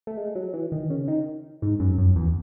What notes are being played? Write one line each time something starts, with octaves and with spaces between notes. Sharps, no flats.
A3
G#3
F#3
E3
D#3
C#3
D#3
G#2
F#2
F#2
E2